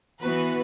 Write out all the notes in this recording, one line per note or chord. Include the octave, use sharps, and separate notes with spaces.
E3 B3 F#4 B4